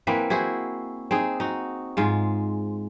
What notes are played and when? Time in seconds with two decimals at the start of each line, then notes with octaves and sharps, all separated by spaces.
0.07 E3 A#3 C4 B4
0.30 E4 F#4 G#4 C5
1.11 C4 D#4 G#4
1.40 D#4 F#4
1.97 G#2 G#3 F4